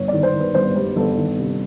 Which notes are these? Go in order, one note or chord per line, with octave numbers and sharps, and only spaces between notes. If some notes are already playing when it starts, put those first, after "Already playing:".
Already playing: G1 C#5
D#3 D5
C5
D#3
B4
G1 C5
G3 C5
G1 A4
D#3
C3